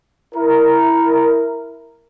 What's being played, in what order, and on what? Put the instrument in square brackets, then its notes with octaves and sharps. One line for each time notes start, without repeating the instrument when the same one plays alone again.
[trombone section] E4 A#4